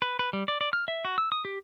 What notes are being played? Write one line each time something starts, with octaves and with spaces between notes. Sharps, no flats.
B4
B4
G3
D5
D5
F6
E5
F#4
E6
D#6
G4